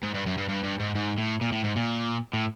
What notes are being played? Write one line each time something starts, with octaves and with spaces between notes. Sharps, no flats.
G#2
G2
F#2
G2
G2
G2
G#2
G#2
A2
A#2
A2
G#2
A#2
A2